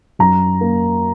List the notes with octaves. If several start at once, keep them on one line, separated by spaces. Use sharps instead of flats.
F#2 A#5
A#3